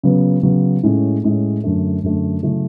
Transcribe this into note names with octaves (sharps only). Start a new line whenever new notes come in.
C#3 F#3 B3
C#3 F#3 B3
A2 G#3 C#4
A2 G#3 C#4
F#2 D3 A3
F#2 D3 A3
C#3 F#3 A3 C#4 E4